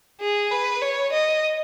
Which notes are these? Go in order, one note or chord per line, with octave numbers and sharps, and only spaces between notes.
G#4
B4
C#5
D#5